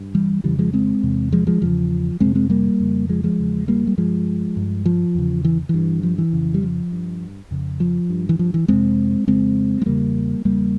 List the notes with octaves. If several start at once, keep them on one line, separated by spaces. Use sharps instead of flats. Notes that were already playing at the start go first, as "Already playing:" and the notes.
Already playing: G2
E3 G3
F2 C#3 E3 G3
F3 G#3
G#3 C4
E2 C3
F3 G#3
F3 G#3
E2 C#3 F3
F2 C3 G#3 C4
G#3 C4
G3 A#3
F2 C#3
F3 G#3
F3 G#3
E2 C#3
G3 A#3
G3
G2 F3 G#3
G2
F3
E2 C#3
E3
G2 E3
F3
E3
F2 C#3
G3
F3
G2
F2 C#3
F3
G2
E3
F3
E3
F2 C3 G#3 C4
F2 C#3 G#3 C4
G#3
E2 C#3 G3 A#3
E2 C#3 G3 A#3